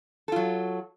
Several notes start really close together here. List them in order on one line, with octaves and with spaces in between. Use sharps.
A4 F4 F#3